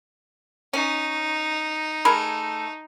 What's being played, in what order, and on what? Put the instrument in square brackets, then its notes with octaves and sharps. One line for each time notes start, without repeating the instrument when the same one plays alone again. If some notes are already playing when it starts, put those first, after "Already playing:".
[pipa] C#4 [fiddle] D#4
[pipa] A3 G#4 A#4 [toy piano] B5